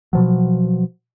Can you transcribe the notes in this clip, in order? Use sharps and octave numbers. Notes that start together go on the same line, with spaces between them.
B2 F3 F#3